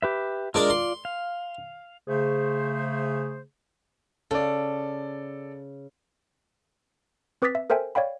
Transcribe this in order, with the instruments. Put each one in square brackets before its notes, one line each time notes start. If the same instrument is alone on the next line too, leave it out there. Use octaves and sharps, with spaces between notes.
[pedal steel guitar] G4 B4 E5
[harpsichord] G#3 D4 A#4 [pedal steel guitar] F4 D5
[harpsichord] C6
[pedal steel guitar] F5
[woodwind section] C#3 A3 G#4 C5
[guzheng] C#3 [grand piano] A4 D5
[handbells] C4 B4 D6 D#6 A6 B6
E5
A4 A#4 C5 E5 G5 G#5
C#5 D5 F5 G5 B5